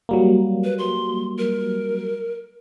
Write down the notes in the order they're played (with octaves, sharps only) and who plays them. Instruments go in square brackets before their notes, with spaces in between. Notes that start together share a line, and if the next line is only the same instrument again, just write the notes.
[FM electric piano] F#3 G3 A#3
[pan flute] B4
C6
A#4